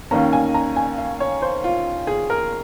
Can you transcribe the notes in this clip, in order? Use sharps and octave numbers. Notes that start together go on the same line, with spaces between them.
D#2 D#3 A#3 C#4 A#5
G#5
A#5
G#5
F5
C#5
C5
F4
G#4
A#4